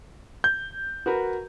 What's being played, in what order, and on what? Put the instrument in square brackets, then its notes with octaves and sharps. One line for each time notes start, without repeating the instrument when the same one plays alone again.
[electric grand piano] G6
[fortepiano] F#4 A#4 B4